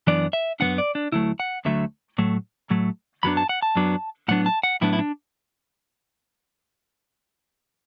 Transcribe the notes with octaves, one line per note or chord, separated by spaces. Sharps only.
F#2 E3 B3 D4 D5
E5
F#2 E3 B3 D4 F#5
D5
D4
D2 D3 F#3 A3 E4
F#5
D2 D3 F#3 A3 E5
A2 F#3 A3
A2 F#3 A3
F#2 F#3 B3 D4 B5
A5
F#5
A5
F#2 F#3 B3 D4
A2 F#3 B3 D4 F#5
A5
F#5
A2 F#3 B3 D4 E4
E4
D4